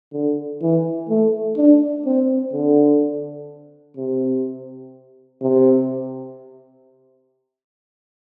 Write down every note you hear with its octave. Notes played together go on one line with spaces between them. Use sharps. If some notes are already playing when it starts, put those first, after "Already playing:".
D3
E3
A3
D4
C4
D3
C3
C3